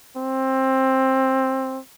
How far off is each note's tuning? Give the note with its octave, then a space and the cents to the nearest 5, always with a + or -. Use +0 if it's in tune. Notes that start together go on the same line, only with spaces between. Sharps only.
C4 +15